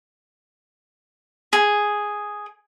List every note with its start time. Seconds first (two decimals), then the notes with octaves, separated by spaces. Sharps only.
1.53 G#4